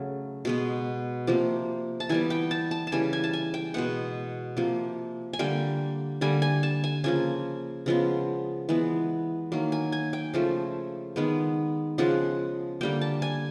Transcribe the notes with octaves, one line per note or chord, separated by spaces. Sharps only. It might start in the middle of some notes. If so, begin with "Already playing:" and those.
Already playing: C#3 F#3 A3
B2 G#3 B3
C3 F3 A#3
A5
E3 G3 B3 G#5
G5
A5
A5
A5
C#3 E3 G3 G#5
G#5
A5
G#5
G5
B2 G#3 B3 F#5
C3 F3 A#3
G#5
D3 G3 A#3 G5
D3 G3 A#3 G#5
G#5
A5
G#5
C#3 F3 A#3 G#5
C#3 F3 G#3 B3
E3 G#3 B3
D#3 F#3 A#3
G#5
G#5
G5
C#3 F3 A3
D#3 G#3 B3
C#3 F3 G#3 F#5
D3 G3 A#3 G5
A5
G#5